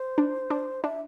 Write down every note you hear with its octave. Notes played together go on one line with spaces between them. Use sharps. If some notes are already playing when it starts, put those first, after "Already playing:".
Already playing: C5
D4
D4
D4 E5